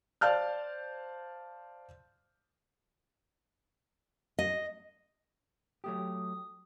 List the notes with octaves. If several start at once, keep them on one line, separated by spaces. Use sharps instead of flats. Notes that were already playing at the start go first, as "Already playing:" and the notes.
C5 D5 F5 A5 F6 G6
D#5
F#3 A3 G4 D#6